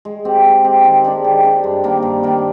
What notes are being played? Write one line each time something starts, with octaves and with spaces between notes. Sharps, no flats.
G#3
C4 G4
G#3
C4 G4
D#3
G#3 D4 G4
D#3
G#3 D4 G4
G2
D#3 A#3 D4
G2
D#3 A#3 D4